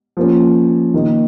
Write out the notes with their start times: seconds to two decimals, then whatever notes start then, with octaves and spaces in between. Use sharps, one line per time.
0.17 F3 A#3 C#4
0.94 D#3 A#3 D#4